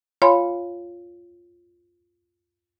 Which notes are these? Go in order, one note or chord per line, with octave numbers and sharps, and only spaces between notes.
F4 C#5 F5 G#5 B5 C6